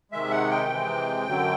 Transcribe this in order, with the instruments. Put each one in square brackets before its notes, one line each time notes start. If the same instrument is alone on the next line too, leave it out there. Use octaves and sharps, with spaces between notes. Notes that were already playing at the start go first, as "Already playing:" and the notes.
[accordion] C3 D#3 G#3 E5
F#5
G5
C3 E3 G#3
F#2 D3 F#3